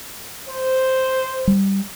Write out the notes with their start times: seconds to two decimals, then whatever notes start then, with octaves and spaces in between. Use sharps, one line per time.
0.49 C5
1.47 G3